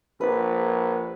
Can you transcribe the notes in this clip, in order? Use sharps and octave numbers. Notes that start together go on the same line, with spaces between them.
A#1 B4